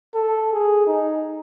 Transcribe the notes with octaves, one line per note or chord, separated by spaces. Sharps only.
A4
G#4
D#4